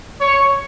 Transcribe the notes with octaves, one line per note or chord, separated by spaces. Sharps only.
C#5